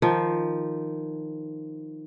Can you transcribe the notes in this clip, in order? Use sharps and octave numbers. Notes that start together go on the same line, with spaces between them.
D#3 F3